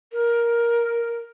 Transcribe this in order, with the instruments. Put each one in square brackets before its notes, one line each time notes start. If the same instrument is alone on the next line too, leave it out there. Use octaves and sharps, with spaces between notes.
[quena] A#4